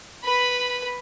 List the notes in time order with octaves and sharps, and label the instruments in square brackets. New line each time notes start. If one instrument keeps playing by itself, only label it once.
[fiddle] B4 B5